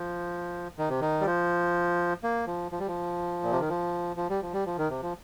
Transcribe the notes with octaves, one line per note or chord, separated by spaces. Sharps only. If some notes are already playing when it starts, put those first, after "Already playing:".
Already playing: F3
D#3
C3
D#3
G3
F3
A#3
F3
F3
G3
F3
A#2
C3
D#3
F3
F3
G3
F3
G3
F3
D#3
C3
F3